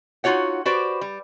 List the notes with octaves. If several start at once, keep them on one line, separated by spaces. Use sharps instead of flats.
D#4 F4 F#4 C#5 F#5
F#4 G4 B4 C5 D5
G3